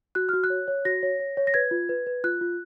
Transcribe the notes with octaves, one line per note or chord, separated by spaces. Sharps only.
F#4 F#6
F#4 F6
F#6
C#5
C#5
F#4 A#6
C#5
C#5
C#5
A#6
B4 G#6
F4
B4
B4
F4 F#6
F4